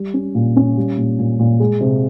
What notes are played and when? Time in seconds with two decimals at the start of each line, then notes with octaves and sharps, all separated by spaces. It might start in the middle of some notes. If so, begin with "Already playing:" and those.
Already playing: G3
0.14 C#4
0.35 A#2
0.56 C#4
0.77 G3
0.97 A#2
1.19 A#2
1.39 A#2
1.60 G#3
1.81 C3